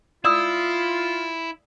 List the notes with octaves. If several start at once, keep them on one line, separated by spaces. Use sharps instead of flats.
E4 F4 D5 D#6 E6